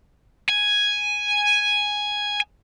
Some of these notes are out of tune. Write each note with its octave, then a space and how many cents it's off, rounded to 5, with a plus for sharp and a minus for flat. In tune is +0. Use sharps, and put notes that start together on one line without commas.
G#5 +0